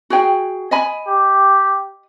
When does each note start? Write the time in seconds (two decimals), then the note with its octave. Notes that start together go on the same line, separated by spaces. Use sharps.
0.10 F#4 G#4 G5
0.71 D#5 G#5 B5
1.07 G4